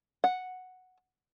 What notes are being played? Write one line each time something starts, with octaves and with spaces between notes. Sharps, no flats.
F#5